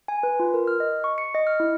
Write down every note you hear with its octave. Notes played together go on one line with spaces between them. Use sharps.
G#5
B4
F4
A#4
F6
D#5
C#6
C#7
D#5
F6
E4